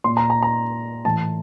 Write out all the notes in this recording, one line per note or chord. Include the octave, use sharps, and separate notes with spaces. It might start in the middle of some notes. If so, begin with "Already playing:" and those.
A#2 C6
A#5
A#5
A#5
A2 E3 A5